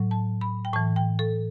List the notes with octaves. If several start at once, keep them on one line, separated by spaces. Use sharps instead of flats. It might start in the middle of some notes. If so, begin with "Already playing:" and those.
Already playing: A2 F#3
A5
B5
G5
A2 E3 A5
G5
A4